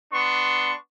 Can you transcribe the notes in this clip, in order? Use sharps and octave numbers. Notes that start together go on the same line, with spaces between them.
B3 D4 C6 C#6